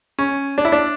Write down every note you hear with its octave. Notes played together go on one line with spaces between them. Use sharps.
C#4
D4
E4
D4